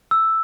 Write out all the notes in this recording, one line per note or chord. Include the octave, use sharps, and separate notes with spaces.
E6